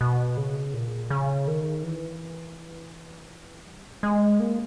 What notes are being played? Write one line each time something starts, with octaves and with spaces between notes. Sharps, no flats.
B2
C#3
A#2
C#3
D#3
E3
G3
G#3
A#3